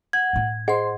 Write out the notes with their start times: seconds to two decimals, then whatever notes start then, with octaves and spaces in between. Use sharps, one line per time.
0.13 F#5 G#6
0.33 A2 E4
0.68 G#4 C5 D#5 F#5 C6